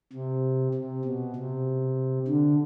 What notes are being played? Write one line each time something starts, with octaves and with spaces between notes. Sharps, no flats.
C3
C3
B2
C3
D3